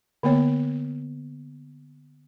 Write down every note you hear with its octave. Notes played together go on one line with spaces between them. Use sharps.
D3 A#3 B3 C#5